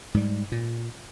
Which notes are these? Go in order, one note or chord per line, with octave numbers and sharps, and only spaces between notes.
G#2 G3
A#2